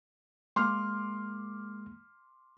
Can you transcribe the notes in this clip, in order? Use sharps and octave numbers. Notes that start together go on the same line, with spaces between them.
G#3 A#3 C6 D6 F6